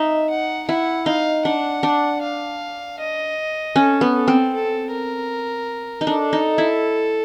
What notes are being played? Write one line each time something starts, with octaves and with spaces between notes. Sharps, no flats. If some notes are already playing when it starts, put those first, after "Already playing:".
Already playing: D#4 E5
F#5
E4 F#5
D#4 F5
D4 F#5
D4
F5
D#5
C#4 A4
B3
A4
C4
A4
A#4
D#4
D4 A4
D#4
E4